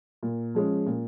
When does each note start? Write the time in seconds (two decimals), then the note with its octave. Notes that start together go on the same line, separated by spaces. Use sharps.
0.23 A#2
0.55 F3 G#3 C#4
0.86 A#2